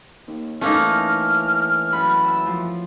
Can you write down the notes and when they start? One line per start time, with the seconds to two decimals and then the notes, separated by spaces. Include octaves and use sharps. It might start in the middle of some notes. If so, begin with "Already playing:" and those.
0.27 D#2
0.61 E3 A3 A#3 C#4 D#4 F6
1.92 F#2 B5
2.24 E5 E6
2.46 F3